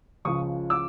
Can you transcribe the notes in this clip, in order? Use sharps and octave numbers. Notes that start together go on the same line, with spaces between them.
C#2 C#3 F3 C#6 D#6
D6 E6